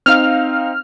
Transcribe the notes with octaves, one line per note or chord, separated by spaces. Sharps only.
C4 D#4 F5 F6